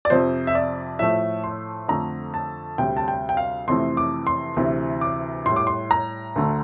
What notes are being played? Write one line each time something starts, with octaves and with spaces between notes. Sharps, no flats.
D5
F2 C3 F3 C5
E5
D5
A2 F3 A3 E5
C6
F2 D3 A3 A#5
A5
D2 C3 G3 G5
A5
G5
G5
F5
F2 C3 E3 A3 C6
D6
C6
D2 C3 E3
D6
A2 G3 C6
D6
C6
A#5
D2 D3 A3